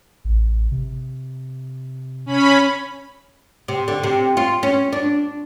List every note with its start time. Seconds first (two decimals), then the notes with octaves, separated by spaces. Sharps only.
0.25 A1
0.72 C3
2.26 C#4 B5
3.68 C3
3.88 D3
4.03 C3
4.37 F4
4.63 C#4
4.92 D4